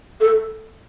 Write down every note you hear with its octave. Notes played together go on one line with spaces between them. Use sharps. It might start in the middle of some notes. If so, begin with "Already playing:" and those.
A4